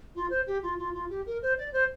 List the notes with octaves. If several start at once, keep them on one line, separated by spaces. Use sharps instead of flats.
F4
C5
G4
F4
F4
F4
G4
A#4
C5
D5
C5